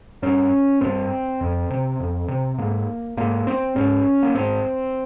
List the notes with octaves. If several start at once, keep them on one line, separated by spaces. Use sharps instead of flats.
G2 C#4
G2 C4
F2
C3
F2
C3
G#2 A#3
G#2 A#3
C4
G#2 C#4
A#3
G#2 C4